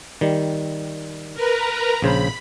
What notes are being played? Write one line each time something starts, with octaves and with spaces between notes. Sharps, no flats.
D#3 G3
A#4 B4 A#5
A#1 C#3 C5 B5